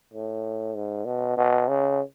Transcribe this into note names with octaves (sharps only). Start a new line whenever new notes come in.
A2
G#2
B2
B2
C#3